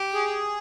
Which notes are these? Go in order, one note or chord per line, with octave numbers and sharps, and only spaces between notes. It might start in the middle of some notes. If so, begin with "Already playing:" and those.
Already playing: G4
G#4